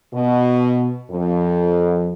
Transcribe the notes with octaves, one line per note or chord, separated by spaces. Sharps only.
B2
F2